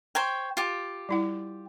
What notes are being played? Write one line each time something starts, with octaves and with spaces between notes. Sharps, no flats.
C5 C#5 G5
F4 G4
G3 E4 F#5